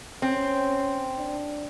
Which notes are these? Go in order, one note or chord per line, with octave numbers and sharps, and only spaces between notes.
C4 C#4
D4